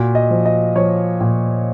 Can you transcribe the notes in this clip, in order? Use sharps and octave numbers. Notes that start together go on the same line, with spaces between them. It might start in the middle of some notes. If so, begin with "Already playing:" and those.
Already playing: A#2 F#4
D#5
F3
D#5
F3 C#5
A#2